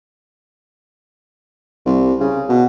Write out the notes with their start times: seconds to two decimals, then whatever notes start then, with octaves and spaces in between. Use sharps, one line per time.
1.85 C2
2.20 C#3
2.49 B2